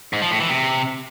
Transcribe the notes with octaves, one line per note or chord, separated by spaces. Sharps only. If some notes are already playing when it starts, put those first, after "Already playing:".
G#2
F3
A2
E3
C3